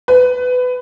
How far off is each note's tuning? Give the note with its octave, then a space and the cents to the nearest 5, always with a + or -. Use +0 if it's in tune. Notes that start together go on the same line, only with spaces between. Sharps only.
B4 +20